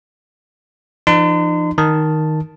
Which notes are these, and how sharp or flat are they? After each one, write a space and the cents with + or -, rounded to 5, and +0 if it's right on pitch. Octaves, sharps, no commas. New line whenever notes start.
F3 -45 D#4 -45 C6 -35
D#3 +0 A5 +0